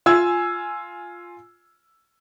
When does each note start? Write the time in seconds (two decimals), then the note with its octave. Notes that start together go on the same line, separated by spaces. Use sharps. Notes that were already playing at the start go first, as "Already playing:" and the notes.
0.06 F4 G#5 E6 G#6